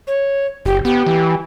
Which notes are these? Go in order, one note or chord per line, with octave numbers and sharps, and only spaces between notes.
C#5
F#1 G4
B3 G4
E3